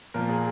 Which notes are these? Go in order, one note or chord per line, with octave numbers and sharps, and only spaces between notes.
A#2 F3 A#4
G#4